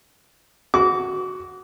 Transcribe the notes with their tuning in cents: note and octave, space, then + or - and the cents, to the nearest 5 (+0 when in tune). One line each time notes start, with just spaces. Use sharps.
F#4 +0 D6 -30